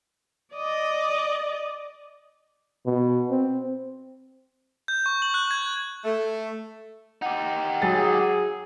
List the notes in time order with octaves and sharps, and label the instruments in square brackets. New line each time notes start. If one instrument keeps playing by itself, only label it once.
[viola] D5 D#5
[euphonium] B2
C4
[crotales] G6
C#6
F#7
F#6
G#6
[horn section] A3
[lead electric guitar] D#4 G4 [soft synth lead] F#5
[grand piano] F#3 A6 [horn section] G#4